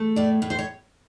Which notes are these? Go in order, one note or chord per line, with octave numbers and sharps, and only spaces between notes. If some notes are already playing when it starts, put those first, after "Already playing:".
Already playing: A3
A2 D5
A2
C5
C#5